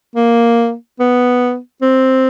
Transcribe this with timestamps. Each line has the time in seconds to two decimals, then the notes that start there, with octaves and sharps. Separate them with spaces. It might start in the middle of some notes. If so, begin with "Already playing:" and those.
0.16 A#3
1.00 B3
1.82 C4